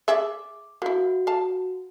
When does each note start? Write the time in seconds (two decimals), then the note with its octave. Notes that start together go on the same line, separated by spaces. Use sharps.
0.08 G#4 D5 E5 D6
0.82 A#3 E4 F#4
1.27 F5 A5